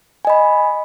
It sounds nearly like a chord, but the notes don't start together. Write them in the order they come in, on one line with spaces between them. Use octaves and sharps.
G#5 D#5 B5